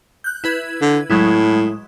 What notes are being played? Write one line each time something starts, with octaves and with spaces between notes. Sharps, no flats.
F#6 G6
E4 B4 G#6
D3
A2 F#3 G#3 E4